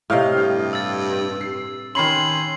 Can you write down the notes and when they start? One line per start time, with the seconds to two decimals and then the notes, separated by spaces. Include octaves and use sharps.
0.10 A2 C3 D#5 F5 F6
0.36 G2
0.73 E6 A6
1.41 C7
1.95 D#3 C#4 B5 C6 C7 F#7